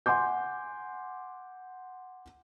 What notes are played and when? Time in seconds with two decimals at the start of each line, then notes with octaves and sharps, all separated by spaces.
0.06 F#5 G#5 C6 D6 G6